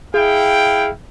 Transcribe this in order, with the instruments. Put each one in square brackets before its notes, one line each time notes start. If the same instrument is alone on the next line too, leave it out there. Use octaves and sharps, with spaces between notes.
[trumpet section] E4 F5 G5 [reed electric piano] G#4